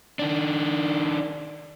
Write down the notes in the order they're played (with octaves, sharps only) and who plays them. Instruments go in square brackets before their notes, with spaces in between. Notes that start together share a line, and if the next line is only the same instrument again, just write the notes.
[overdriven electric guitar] D#3 D4